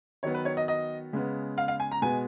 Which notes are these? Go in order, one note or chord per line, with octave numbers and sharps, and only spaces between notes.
D#3 F#3 B3 C#5
B4
C#5
D#5
D#5
C#3 G#3 B3
F5
F5
G#5
A#5
B2 G#3 B3 G#5